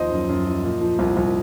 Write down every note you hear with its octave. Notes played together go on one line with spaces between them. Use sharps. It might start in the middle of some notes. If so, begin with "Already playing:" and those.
Already playing: D#2 F3 C5 D#5
F#2
F#2
F3
A#2
F3
C2
C2